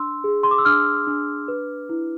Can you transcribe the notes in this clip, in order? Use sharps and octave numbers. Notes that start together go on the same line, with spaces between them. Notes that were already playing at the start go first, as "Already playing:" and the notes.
Already playing: D4 C6 E6
G#4
C6
D6
E6
D4 D6 F6
D4
B4
E4